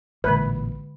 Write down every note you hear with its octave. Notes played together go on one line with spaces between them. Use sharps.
A1 A#2 D3 G#3 B4